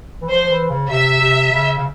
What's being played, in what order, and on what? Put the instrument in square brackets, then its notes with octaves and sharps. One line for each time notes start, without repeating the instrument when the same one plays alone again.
[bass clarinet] E3
[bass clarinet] F3 [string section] C5
[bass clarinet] F3
E3
C#3
[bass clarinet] C3 [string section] E5
[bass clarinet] C3
C#3
C#3